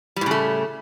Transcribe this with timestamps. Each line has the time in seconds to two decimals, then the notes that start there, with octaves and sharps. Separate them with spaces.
0.16 G3
0.21 A2
0.26 C#3
0.31 A3